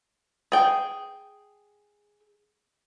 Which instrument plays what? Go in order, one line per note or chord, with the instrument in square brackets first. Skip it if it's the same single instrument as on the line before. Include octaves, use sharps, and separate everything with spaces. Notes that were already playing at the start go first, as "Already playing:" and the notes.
[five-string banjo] G#4 G5